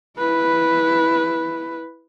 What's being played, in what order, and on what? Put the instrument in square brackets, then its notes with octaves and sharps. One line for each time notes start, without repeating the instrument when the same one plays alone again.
[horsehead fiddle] E4 B4